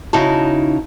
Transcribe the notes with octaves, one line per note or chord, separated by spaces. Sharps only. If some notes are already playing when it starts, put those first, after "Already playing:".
C#3 D#4 E4 F#4 A5